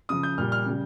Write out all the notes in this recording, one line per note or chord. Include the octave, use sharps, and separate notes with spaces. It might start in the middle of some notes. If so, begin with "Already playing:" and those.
C#3 F3 D#6
G6
A#2 G3 F6
F6
C#3 G3